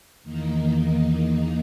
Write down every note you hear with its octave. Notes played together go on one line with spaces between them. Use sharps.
E2 D#3 A#3 D#4